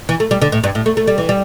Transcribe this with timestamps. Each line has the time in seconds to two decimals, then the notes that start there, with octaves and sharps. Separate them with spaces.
0.09 E3
0.20 A3
0.31 G3
0.42 D3
0.52 A2
0.64 G2
0.75 A2
0.86 A3
0.97 A3
1.07 G3
1.18 E3
1.29 G3